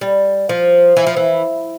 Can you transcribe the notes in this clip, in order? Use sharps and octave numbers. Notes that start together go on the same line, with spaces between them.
G3
F3
E3
F3
E3